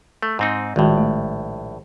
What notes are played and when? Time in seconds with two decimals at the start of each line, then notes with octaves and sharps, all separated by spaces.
0.23 A3
0.39 G#2 C4 D#4
0.76 A#1 A2 D#3 G#3 F#4
0.98 A3